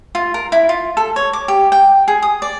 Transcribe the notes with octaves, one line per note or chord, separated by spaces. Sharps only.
F4
A#4
E4
F4
A4
C#5
D6
G4
G5
G#4
D#6
D5